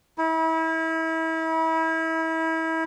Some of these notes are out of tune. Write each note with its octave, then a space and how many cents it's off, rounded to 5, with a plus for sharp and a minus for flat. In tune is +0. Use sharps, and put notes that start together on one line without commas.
E4 -30